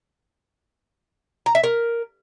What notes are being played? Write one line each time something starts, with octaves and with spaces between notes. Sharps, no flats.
A#5
E5
A#4